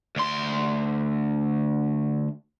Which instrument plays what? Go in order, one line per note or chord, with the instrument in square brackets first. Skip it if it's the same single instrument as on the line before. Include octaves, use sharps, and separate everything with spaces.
[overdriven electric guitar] D2 C6